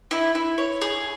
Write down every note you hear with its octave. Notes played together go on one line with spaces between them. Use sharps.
E4
E4
C#5
G#4